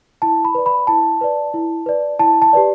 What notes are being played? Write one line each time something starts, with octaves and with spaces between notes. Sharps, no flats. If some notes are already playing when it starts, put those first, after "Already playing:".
E4 A5
B5
B4 D5
B5
E4 A5
B4 D5
E4
B4 D5
E4 A5
A5
G4 B4 D5